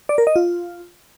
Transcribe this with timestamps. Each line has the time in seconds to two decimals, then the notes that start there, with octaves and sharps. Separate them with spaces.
0.09 D5
0.18 A#4
0.27 D#5
0.36 F4